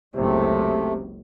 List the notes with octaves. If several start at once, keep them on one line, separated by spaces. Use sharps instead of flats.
F#1 C#2 C3 A3